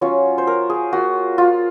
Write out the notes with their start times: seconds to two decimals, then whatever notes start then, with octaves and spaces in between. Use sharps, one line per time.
0.01 F#3 C#4 F4 C#5
0.38 C5
0.47 A#4
0.70 G#4
0.92 A#3 F4 F#4
1.38 F4